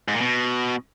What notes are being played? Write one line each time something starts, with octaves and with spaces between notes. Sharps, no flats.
G#2
A#2
B2